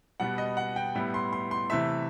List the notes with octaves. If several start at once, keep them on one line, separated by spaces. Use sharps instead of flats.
B2 G3 B3 F#5
D#5
F#5
G5
A2 G3 B3 E4
C6
C6
C6
C3 E3 A3 E5